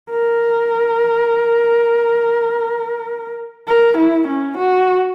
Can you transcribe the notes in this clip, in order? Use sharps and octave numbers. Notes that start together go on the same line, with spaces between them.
A#4
A#4
E4
C#4
F#4